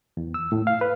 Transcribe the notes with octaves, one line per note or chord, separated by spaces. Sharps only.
E2
E6
A2
F5
B4